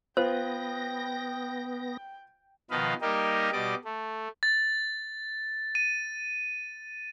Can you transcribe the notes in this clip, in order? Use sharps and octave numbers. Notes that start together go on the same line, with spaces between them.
B3 F4 B4 C5 G5 A#6
B2 D#3 F3 B4 D#5 F5
G3 A#3 D#4 G4 A#4 D#5
B2 G3 D5 D#5 D6
A3
A6
D#7